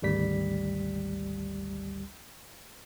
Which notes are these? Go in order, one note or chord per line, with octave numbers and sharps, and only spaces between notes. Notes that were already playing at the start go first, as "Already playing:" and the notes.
G#1 D2 G3 B6